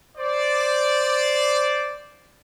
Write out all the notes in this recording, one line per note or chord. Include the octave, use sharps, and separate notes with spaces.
C5 D5